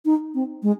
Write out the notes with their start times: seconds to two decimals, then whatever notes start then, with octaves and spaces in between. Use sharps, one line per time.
0.05 D#4
0.34 C4
0.63 G#3